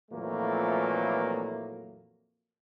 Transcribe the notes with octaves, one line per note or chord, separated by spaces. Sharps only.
F2 A#2 E3 F#3 A3 A#3